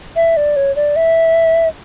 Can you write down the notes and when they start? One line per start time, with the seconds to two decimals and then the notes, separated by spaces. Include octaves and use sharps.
0.16 E5
0.37 D5
0.56 C#5
0.76 D5
0.96 E5